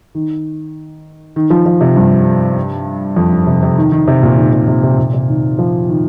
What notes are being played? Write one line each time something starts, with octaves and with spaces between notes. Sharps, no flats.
D#3
D#3
F3
F3
C3
G2
F2
G2
C3
C3
D#3
D#3
C3
A#2
D#3
C3
C3
C3
A#2
C3
D#3
F3
D#3